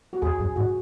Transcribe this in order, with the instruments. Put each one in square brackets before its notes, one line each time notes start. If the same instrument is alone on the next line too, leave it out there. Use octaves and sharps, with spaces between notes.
[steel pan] F#4
[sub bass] E2 [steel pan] G#4
[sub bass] F#2 [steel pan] G#4
[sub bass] G#2 [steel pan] F#4